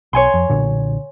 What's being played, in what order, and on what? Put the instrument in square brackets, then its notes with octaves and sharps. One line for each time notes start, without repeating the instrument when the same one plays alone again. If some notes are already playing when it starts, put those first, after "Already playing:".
[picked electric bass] B1 [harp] C#5 G#5 C6
[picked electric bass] F2
B1 A#2 D3